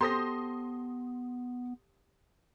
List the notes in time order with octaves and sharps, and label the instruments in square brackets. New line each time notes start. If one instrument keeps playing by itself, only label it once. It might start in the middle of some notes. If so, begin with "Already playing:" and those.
[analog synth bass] B3 [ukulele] G4 A4 C5 [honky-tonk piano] C6 D#6 A#6